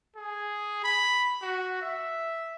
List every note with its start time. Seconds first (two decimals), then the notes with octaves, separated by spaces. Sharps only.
0.16 G#4
0.84 B5
1.42 F#4
1.82 E5